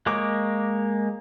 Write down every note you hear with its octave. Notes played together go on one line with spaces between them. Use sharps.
G#3 A#3 C#5 D6